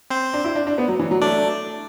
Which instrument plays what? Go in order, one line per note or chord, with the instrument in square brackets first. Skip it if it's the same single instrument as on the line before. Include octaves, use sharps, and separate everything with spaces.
[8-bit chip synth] C4 C5
[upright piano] D4
E4
D4
D4
B3
F#3
E3
F#3
[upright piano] A3 [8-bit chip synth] D4 D5